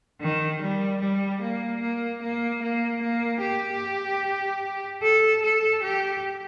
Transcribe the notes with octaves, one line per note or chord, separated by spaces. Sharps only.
D#3
G3
G3
A#3
A#3
A#3
A#3
A#3
G4
A4
A4
G4